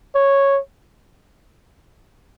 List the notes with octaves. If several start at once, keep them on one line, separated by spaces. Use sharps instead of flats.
C#5